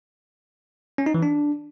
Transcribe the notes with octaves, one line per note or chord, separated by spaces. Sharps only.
C#4
D#4
E3
D4